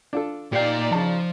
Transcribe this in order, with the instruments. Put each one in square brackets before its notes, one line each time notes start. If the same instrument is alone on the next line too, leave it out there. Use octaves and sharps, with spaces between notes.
[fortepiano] D4 F4 A4
[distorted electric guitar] A#2 F5 [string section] D#4 D5 [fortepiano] G4 G5
[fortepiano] C#3 A5 [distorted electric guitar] F3